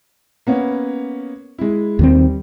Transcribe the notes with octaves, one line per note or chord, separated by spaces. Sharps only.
A#3 B3 C#4
G#3 E4
D#2 D#3 G3 C4